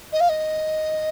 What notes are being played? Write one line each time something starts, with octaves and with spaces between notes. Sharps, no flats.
D#5
F5
D#5